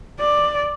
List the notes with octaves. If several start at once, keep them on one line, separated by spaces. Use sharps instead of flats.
D5